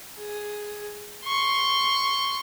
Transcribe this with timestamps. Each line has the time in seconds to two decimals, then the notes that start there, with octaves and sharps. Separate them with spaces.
0.17 G#4
1.25 C6 C#6